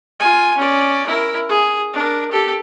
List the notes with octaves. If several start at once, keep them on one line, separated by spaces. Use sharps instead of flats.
F4 G#5
C#4 D5
E4 A#4
G#4
D4 A#4
G4 A4